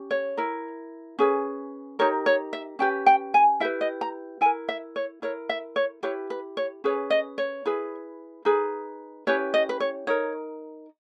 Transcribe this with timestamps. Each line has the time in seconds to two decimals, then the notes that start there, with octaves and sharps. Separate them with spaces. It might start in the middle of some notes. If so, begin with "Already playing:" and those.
Already playing: C#4 G4
0.11 C#5
0.37 E4 A#4
1.19 C#4 G#4 B4
1.99 D#4 G4 A#4 C#5
2.26 C#5
2.53 E5
2.79 C#4 G4 B4 G5
3.06 G5
3.34 G#5
3.60 E4 G4 B4 E5
3.81 D#5
4.01 A#5
4.41 E4 G#5
4.45 A#4
4.69 E5
4.96 C#5
5.22 E4 A#4 C#5
5.49 E5
5.76 C#5
6.03 E4 G4 B4 C#5
6.30 B4
6.57 C#5
6.84 C#4 G#4 B4 C#5
7.10 D#5
7.38 C#5
7.65 E4 G#4 B4
8.45 D#4 G#4 B4
9.27 C#4 E4 G4 B4 C#5
9.54 D#5
9.69 B4
9.80 C#5
10.07 D#4 A#4 C#5